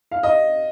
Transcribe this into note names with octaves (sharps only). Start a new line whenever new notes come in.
F5
D#5